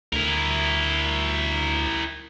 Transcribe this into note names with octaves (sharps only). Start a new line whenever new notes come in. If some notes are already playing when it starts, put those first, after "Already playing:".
D2 E4 A#4